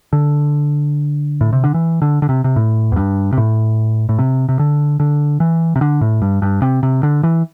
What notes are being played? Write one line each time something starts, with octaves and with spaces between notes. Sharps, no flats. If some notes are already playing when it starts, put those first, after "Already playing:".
D3
A2
C3
D3
E3
D3
D3
C3
C3
A2
E2
G2
C3
A2
A2
C3
C3
D3
D3
E3
C3
D3
A2
G2
G2
C3
C3
D3
E3